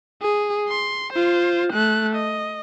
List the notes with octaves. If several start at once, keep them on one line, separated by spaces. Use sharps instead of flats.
G#4
C6
F4 C5
A3 F#6
D#5